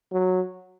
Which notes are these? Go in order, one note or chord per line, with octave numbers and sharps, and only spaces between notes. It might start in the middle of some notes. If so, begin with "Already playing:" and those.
F#3